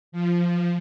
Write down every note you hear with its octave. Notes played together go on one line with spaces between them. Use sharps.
F3